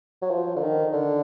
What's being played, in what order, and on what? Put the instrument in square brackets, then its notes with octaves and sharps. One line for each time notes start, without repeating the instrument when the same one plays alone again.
[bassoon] F#3
F3
D3
D#3
D3